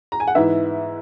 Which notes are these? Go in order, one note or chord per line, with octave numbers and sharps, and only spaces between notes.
A#5
G#5
F#5
G#2 E3 B3 E4 E5